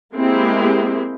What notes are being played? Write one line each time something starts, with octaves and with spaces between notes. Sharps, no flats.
G#3 A#3 C4 E4 G4